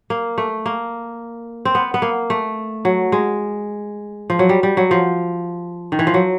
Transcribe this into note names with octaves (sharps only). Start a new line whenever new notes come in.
A#3
A3
A#3
C4
B3
B3
A#3
A3
F#3
G#3
F3
F#3
G3
G3
F#3
F3
D#3
E3
F3
F#3